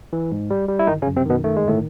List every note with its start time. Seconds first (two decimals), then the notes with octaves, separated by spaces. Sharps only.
0.13 E3
0.32 G#2
0.50 G3
0.68 G3
0.79 E4
0.87 G1 D#3 D#4
1.02 C#3 C#4
1.07 F#2
1.16 C3 C4
1.26 B2 D#3 B3
1.44 D#3 A3
1.56 G#3
1.64 G1 A2 A3